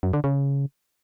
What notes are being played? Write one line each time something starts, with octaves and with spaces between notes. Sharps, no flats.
F#2
D3
C#3